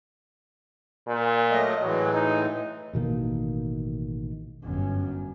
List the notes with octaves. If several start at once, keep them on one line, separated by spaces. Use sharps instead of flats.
A#2
F#3 A3 D#5
A2 E3 F#3 G#3
D#4
A1 B2 D#3 A#3
G1 F#2